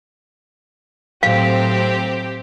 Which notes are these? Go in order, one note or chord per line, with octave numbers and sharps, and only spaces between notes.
A2 F#3 C4 G4 F5